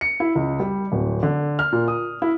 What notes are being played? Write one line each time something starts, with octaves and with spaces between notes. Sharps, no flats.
C#7
E4
C#2
G3
D1
D3
F6
A#2
D#6
E4